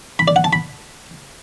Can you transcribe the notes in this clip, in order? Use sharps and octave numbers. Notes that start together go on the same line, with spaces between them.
B5
D5
F#5
A5
B5